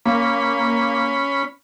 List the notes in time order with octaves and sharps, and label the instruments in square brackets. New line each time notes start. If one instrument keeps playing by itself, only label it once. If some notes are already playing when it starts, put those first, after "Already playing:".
[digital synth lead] A#3 [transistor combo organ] C#4 B5